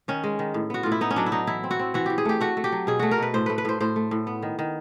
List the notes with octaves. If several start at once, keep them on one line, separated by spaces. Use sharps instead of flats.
D#3 C#4
G#3
D#3
A2
B3 F#4
A2 F4
E4
B3 D#4
C#4
F#3 D4
E4
F#3 D#4
E3 E4
C4
F#4
C4
E3 F#4
E3 G4
G#4
A3 G4
A3 F#4
A3
G4
F#3
B2 G#4
A3 F#4
A#4
B2 B4
A2 C5
A3 B4
B4
A2 C5
A2 C5
A3
A2
B3
D#3
D#3